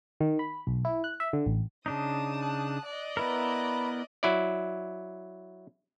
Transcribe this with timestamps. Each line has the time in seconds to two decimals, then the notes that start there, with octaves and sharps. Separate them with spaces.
0.21 D#3
0.39 B5
0.67 B1
0.85 E4
1.04 F#6
1.20 E5
1.33 D3
1.46 A1
1.86 C#3 D4 D#4 A5 D#6
2.42 F#6
2.84 D5 D#5
3.17 B3 E4 A#4 B4 A#5
4.23 F#3 E4 D5